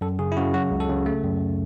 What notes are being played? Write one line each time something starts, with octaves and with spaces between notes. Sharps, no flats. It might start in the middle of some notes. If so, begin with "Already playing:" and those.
F#2 A4
C#3 G#4
E4
C#3 F#4
F#3 F#4
C#2
A4
C#3
A3
F#2